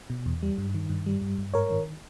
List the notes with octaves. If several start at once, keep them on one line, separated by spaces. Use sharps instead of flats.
B2
E2
G3
G2
D#3
G2
G3
G2
G2
G#2 A#4 C#5
D#3